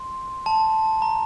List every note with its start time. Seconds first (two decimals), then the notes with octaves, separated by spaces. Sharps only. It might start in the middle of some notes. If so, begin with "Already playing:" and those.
Already playing: C6
0.46 A5
1.02 A#5